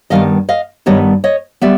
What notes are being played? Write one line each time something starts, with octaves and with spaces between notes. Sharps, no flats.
G2 D#3 G3 B3 D#5 F5
D#5 F5
G2 D#3 G3 B3 C#5 D#5
C#5 D#5
G3 B3 D5 E5